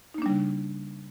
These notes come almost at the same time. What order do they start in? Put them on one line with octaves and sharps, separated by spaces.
D#4 A#3 D4 G3 C#3